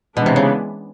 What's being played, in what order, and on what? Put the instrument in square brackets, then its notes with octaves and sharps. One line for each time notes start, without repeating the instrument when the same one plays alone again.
[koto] B2 [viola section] E3 G#3 B3 D4
[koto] C3
C#3